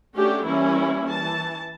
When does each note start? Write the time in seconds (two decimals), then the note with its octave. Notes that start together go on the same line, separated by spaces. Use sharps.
0.15 A3 C#4 D4 F#4 G4
0.44 E3 G3 A#3 C#4 E4
1.08 E3 A5